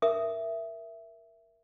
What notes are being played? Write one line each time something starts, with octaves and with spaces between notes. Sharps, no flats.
A#4 E5 D#6